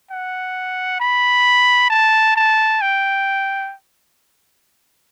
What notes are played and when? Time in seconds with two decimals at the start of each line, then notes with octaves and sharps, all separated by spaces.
0.11 F#5
1.00 B5
1.90 A5
2.36 A5
2.81 G5